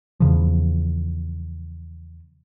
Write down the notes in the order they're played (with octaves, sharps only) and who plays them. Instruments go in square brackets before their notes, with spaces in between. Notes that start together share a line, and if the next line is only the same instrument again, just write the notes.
[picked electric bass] E2 C#3 F3